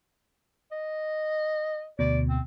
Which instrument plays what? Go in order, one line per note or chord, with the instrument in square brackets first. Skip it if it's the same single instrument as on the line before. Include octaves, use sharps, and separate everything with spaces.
[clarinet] D#5
[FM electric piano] D2 B2 [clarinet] D5
[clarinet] C4